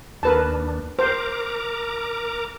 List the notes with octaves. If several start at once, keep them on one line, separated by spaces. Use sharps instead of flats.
D#2 D4 A#4 B4 A5
A#4 C5 A#5 D6